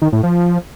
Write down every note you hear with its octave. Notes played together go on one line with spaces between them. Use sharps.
D#3
A2
F3